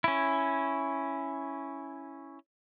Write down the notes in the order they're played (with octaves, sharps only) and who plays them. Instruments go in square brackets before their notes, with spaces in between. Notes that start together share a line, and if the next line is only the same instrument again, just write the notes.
[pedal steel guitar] C#4 E4